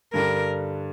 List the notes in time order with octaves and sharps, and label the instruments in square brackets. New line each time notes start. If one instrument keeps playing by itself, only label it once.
[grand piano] G2 D3 G3 D4 [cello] A#4